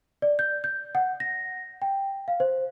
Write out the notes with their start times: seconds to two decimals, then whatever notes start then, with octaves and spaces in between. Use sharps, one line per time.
0.22 D5
0.39 G6
0.64 G6
0.95 F#5
1.20 A#6
1.82 G5
2.28 F5
2.40 C5